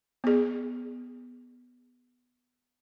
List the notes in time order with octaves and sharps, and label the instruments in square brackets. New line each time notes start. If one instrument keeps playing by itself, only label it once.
[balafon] B3 G#4